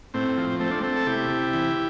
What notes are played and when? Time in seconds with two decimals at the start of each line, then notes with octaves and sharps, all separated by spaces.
0.14 A2 C4
0.37 F3
0.60 A3 C4
0.71 D4
0.81 A3 C4
0.96 A4
1.06 C3 E4 G4
1.30 C3
1.53 E3